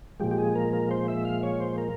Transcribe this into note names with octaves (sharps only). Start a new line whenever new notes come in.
A#2 F3 G#3 G4
G4
G#4
A#4
A#4
C5
E5
F5
C#5
C5
A#4